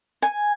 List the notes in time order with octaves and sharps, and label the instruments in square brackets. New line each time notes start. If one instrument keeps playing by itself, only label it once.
[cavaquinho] G#5